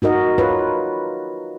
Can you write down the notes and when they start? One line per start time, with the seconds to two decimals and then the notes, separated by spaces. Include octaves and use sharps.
0.02 D#4 F#4 A#4 D#5
0.38 F4 B4 C#5